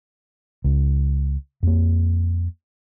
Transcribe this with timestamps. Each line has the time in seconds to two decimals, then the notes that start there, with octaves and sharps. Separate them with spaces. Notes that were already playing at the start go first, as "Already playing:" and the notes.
0.64 C#2
1.63 F2 A#3